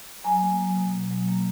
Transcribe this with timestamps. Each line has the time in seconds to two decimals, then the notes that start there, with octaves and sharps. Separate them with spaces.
0.24 F#3 G#5 A#5
0.42 A#3
0.59 F#3
0.76 B2
0.93 A#3
1.11 F#3
1.28 A#3